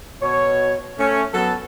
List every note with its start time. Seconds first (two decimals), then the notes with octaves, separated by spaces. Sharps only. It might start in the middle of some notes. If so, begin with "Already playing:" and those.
0.21 B2 C#5
0.98 A3 C#4
1.34 F#3 B3 A4